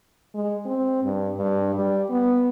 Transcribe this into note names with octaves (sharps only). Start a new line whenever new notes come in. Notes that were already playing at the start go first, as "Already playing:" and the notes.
G#3
C4
G2
G2
G3
B3